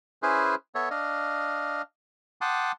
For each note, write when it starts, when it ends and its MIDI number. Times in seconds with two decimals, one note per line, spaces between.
0.23 0.55 61
0.23 0.55 64
0.23 0.55 68
0.23 0.55 71
0.23 0.55 72
0.75 0.89 59
0.75 0.89 69
0.75 0.89 73
0.75 0.89 76
0.91 1.82 62
0.91 1.82 75
0.91 1.82 77
2.41 2.72 78
2.41 2.72 79
2.41 2.72 81
2.41 2.72 84
2.41 2.72 86
2.41 2.72 87